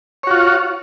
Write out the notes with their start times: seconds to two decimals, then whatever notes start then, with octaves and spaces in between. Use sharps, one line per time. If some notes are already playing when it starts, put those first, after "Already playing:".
0.23 C#5
0.27 F#4
0.31 F4